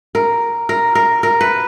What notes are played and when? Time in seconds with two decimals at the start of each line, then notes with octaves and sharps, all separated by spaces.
0.15 A#4
0.69 A#4
0.95 A#4
1.23 A#4
1.41 B4